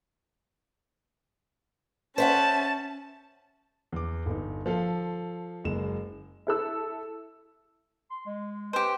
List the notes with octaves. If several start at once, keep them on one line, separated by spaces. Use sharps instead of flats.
C#4 C5 E5 F#5 A5
E2 D6
G1 D#4
F3 A4 F5
F#1 G#3 E7
E4 A4 E6
C6
G#3
G4 B4 C5